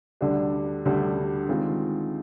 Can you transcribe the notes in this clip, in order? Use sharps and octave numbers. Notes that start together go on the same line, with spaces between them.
D2 D3 G3 D4
D2 D3 G3 D4
D#3 G#3 C4 F4